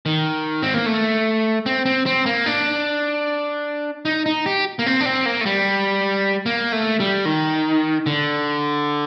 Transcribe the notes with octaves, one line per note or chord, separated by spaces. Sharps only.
D#3
C4
A#3
A3
C4
C4
C4
A#3
D4
D#4
D#4
G4
A#3
C4
D4
C4
A#3
A3
G3
A#3
A3
G3
D#3
D3